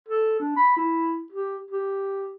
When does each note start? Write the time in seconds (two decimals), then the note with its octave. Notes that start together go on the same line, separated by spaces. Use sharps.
0.08 A4
0.40 D4
0.57 B5
0.77 E4
1.32 G4
1.71 G4